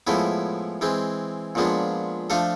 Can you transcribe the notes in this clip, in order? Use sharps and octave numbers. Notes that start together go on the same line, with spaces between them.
A2 F3 G#3 B3 E4
E3 G#3 C4
A#2 F3 G#3 B3 D4
F3 A3 D4 F4 A4